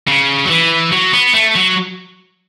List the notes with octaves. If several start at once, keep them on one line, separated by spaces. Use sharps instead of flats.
C#3
F#3
E3
F#3
B3
A3
F#3